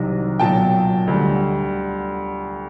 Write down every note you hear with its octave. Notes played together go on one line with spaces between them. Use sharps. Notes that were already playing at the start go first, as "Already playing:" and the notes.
Already playing: C2 C3 D#3 F#3
B1 A#2 F#3 G5 A5
D2 D3 G3